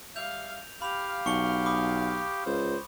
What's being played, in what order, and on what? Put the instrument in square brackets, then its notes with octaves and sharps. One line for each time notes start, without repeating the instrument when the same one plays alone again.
[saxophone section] G3 E5 F5 [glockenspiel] G6 F7
[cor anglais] G4 [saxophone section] F5 [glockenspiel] B5 F7
[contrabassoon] B1 [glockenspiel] C#6 C#7 G7
[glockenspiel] B5 D6 D#6
[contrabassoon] C#2 [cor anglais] C5